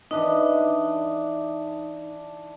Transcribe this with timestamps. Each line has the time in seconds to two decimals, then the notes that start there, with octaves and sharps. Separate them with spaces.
0.11 E3 D4 D#4 D#5